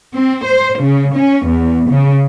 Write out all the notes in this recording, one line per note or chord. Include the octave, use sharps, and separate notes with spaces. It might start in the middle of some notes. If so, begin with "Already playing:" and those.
C4
C5
C#3
C#4
E2
C#3